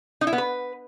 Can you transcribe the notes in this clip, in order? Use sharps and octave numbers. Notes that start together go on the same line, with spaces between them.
D#4
E4
B3
B4